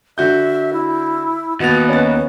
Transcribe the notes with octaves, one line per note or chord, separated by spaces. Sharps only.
D3 F#4 E5 G6
E4
D#2 B3 F#4 F7
C#4 A6